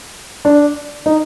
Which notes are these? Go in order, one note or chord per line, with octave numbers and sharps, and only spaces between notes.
D4
D#4